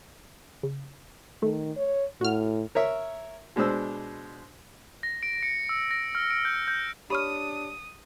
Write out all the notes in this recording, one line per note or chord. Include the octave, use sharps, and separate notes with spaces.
C#3
D#3 A3
C#5
A2 F#4 F6
A#4 C#5 E5
B2 G#3 D4 C5 E6
A#6
D7
C#7
E6
A#6
F6
D7
G6
G6
D4 G4 C#5 B5 C#6 D#6 F6 D#7